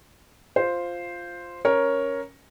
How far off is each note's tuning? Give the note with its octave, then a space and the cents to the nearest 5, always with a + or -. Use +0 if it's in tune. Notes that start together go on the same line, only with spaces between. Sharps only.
F4 +0 C5 +0
C#4 +0 A#4 +10 C#5 +0